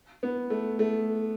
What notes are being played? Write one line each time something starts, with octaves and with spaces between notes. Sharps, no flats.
B3
A3
A3